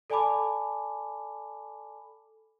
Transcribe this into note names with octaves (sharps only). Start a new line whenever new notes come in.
A4 D5 G#5 A5 B5 D6